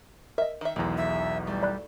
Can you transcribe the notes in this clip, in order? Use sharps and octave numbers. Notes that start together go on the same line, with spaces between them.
A#4 D#5 E5
D#3 E5
B1 E2 D#3 G#3
E5
G3 A3
D5 B5 F#6